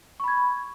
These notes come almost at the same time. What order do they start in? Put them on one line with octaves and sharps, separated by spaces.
C#6 B5 G#6